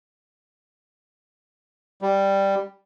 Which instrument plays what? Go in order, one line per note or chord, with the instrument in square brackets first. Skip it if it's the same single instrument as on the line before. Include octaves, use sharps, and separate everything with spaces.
[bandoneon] G3